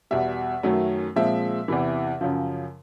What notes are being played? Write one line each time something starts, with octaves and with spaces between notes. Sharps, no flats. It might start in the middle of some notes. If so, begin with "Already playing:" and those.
E2 B2 G3 E5
F#2 D#3 F#3 A3 C#4
A#2 F3 G#3 C4 E5
E2 C3 E3
F#2 C#3 F3